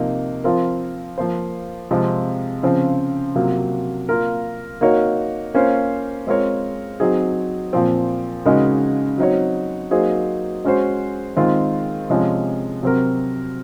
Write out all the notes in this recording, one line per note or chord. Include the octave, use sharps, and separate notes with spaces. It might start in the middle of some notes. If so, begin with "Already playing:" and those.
Already playing: C3 F3 A#3 D#4
F3 C4 F4 A#4
F3 A#3 F4 C5
C3 F3 G#3 C4 F4
C#3 F3 C4 F4
C3 F#3 A#3 F4
A#3 F4 A#4
A#3 D#4 F#4 A#4 C#5
A#3 C#4 F4 C5
G#3 C4 F4 A#4 C#5
F#3 C4 D#4 G#4
A#2 F3 C4
C#3 G#3 D#4 F#4 A#4
F#3 C4 D#4 F#4 C#5
F#3 A#3 D#4 G#4 C5
G#3 C#4 F#4 C5
D#3 G#3 C4 F4
C3 F3 G#3 C#4
C3 F#3 C4 F#4 A#4